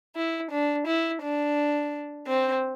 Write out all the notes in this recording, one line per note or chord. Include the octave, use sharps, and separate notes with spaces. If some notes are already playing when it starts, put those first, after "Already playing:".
E4
D4
E4
D4
C4